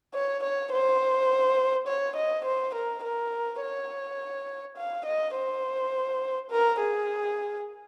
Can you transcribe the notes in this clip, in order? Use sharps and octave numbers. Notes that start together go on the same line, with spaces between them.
C#5
C#5
C5
C#5
D#5
C5
A#4
A#4
C#5
F5
D#5
C5
A#4
G#4